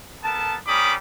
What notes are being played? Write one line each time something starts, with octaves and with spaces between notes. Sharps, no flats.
B3 A4 A#4 A5
G3 C#4 A#4 B5 D6 D#6